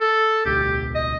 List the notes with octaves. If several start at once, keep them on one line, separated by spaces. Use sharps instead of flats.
A4
D1 B1 G4
D#5